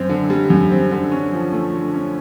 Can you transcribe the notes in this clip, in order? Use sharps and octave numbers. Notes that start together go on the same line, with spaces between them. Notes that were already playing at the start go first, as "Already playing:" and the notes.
Already playing: F#2 C4
D3
G3
F#2
C4
D3
C#4
F3
A3
D3
C#4